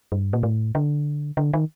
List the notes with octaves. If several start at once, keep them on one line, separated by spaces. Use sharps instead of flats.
G2
A#2
A2
D3
D3
D#3